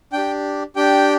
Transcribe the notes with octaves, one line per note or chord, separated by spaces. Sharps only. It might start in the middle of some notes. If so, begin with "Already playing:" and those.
D4 G4 G5
D4 G4 G5